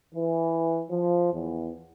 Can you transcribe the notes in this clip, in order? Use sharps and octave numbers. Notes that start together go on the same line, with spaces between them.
E3
F3
E2